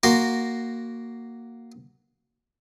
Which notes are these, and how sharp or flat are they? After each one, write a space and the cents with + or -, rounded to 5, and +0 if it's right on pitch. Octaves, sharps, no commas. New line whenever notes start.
A#3 -5 F#4 +0 C6 +0